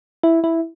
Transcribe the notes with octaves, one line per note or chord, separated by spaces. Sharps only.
E4
E4